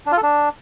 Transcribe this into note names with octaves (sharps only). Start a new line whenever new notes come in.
D4
F4
A4
D4